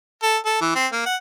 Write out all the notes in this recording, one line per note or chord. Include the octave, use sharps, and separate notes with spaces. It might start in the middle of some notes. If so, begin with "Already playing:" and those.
A4
A4
E3
C4
A#3
F#5